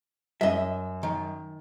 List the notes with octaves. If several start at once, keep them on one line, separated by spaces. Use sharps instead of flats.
F#2 D#5 E5
D#3